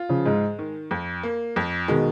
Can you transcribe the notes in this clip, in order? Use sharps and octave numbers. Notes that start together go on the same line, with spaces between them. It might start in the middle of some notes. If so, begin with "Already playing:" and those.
Already playing: F4
C#3 F3
G#2 G#3
D#3
F2
A#3
F2
B2 D#3 G#3